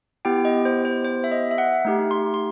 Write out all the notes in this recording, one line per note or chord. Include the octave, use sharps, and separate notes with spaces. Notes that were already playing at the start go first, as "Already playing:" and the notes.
B3 E4 G4 G5
D#5
C5
C5
C5
E5
D#5
E5
F#5
A3 D#4 G4
C6
C6